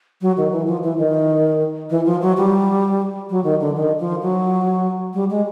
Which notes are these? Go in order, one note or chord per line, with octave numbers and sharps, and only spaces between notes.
F#3
D#3
E3
F3
E3
D#3
E3
F3
F#3
G3
F#3
D#3
D3
D#3
F3
F#3
G3
G#3